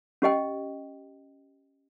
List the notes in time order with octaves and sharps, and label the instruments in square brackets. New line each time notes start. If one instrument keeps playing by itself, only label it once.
[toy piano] C#4 G4 D#5 G5